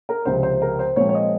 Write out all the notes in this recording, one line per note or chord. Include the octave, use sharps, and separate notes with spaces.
A#4
C#2 C3 F3 C5
C5
A#4
C5
A#2 F3 G#3 C4 C#5
C#5
D#5